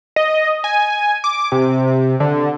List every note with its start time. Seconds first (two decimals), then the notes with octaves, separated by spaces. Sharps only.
0.16 D#5
0.64 G#5
1.24 D6
1.52 C3
2.20 D3